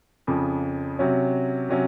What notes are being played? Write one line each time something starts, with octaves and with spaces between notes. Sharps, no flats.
F2 C#3 F3
C3 F#3 C#4
C3 F#3 C#4